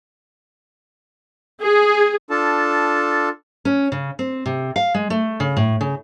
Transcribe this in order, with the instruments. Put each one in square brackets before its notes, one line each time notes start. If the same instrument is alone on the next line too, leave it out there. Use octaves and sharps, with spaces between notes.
[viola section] G#4
[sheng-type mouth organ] D4 F4 A4 A5
[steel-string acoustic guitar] C#4
C#3
C4
C3
F5
G#3
A3
C#3
A2
C#3